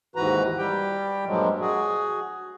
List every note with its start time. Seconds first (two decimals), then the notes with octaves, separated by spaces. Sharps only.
0.16 D#2 G#2 E3 F#4 B4 A#5
0.58 G3 G4 G5
1.26 G2 A#2 F3 F#3 G#3
1.60 F#4 G#4